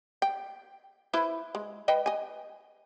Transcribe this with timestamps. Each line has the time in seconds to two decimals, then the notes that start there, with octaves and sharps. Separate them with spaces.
0.22 G5
1.13 E4 B4 C5
1.55 G#3
1.88 B4 D#5 G5
2.06 D#5 G#5